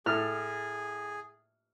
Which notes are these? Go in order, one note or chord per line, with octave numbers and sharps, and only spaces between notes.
A2 G#4 A4 F6